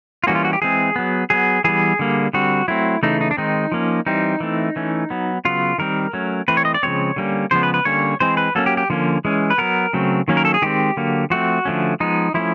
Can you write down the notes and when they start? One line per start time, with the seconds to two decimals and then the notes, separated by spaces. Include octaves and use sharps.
0.24 F4
0.27 E3 G3 A#3 C#4 F#4
0.35 F4
0.45 F#4
0.53 G4
0.62 E3 G#3 C4 G#4
0.96 F#3 B3
1.30 F#3 B3 G#4
1.64 E3 G3 B3 G#4
1.99 D3 G3 A#3
2.33 D3 G3 C4 F#4
2.68 F#3 A3 C4 E4
3.03 C#3 E3 A3 D#4
3.21 D#4
3.31 D4
3.37 D#3 G#3 C4 D#4
3.72 F3 A#3 C#4
4.06 E3 G3 C4 D#4
4.40 E3 A3 C4
4.76 E3 A3 C#4
5.10 F#3 B3
5.45 C#3 F#3 B3 F4
5.78 D#3 G3 C4 A#4
6.13 F#3 A3 C#4
6.48 E3 A3 C4 B4
6.57 C#5
6.65 D#5
6.74 D5
6.83 C#3 F3 G#3 C4 C#5
7.16 D3 G3 A#3 C#4
7.51 C#3 F3 G#3 B3 C5
7.63 B4
7.74 B4
7.85 D3 G3 A#3 C#4 C#5
8.20 E3 G#3 C4 C5
8.37 B4
8.55 F#3 A#3 C#4 A4
8.66 G4
8.77 G4
8.90 D3 F3 A#3 C#4
9.25 E3 G#3 C#4
9.50 B4
9.58 F#3 B3 A#4
9.93 C#3 F#3 A3 C4
10.28 D#3 F#3 A#3 C#4
10.37 A#4
10.45 A4
10.54 G#4
10.62 D#3 G#3 C4 G4
10.97 D3 F#3 A#3
11.30 F3 A3 C4 F#4
11.65 D3 F3 A3 C#4
12.00 F3 G#3 B3 D#4
12.34 F3 A3 C#4 E4